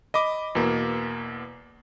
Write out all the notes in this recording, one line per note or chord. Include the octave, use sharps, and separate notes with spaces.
D#5 B5 D6
E2 B2 A#3